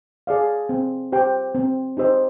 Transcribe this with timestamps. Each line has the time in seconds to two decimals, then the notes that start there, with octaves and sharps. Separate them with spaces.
0.27 G#4 D5 F5
0.69 C4
1.12 G4 C5 G5
1.55 C4
1.97 D#4 G4 C5 D#5